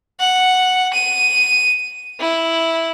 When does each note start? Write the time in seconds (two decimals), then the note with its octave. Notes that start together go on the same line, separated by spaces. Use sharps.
0.20 F#5
0.94 D#7
2.20 E4